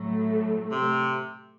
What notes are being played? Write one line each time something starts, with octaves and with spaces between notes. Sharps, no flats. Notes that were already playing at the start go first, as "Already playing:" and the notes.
Already playing: A2 F#3 A3
C3